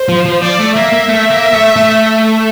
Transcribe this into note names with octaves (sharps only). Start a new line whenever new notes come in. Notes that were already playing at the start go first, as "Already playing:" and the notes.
Already playing: C5
F3
F3
F3 D5
A3
A#3 E5
A#3
A3
A#3
A3
A3